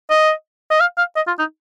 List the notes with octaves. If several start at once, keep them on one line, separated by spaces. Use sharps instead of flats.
D#5
D#5
F5
F5
D#5
F4
D#4